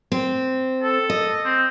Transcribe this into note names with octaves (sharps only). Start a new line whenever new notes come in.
C4
A4
D#5
C4